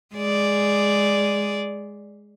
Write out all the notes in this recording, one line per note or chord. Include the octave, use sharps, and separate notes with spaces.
G#3 G#4 D5